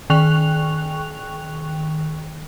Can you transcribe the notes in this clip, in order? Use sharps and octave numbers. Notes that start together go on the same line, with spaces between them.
D#3 G5 C#6 F#6 F7